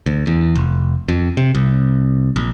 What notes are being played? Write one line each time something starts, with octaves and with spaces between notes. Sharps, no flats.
D2
E2
F1
F2
C3
C2
A#1